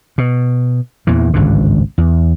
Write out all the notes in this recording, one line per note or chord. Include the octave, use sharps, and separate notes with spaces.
B2
E2 A#2 E3
G#1 C#2 G2 D3
E2